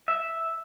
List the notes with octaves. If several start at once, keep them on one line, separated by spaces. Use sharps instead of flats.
E5